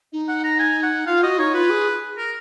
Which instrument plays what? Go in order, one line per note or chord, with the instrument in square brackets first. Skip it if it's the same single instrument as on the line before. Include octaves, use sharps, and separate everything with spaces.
[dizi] D#4
[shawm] F#5
A#5
G#5
F#5
[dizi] F4 [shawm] F5
[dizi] F#4 [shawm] D#5
[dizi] D#4 [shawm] C#5
[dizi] F4 [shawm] B4
[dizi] G#4
[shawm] A#4